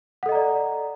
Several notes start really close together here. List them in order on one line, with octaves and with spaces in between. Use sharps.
F#5 A4 D#5 A#5 D5